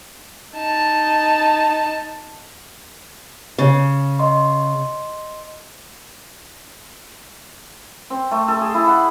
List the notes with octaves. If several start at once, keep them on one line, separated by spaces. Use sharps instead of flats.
D#4 A5
C#3
D#5 C6
C4
A3
A4
G#4
E4
F#5